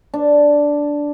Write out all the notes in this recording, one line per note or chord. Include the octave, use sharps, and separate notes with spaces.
D4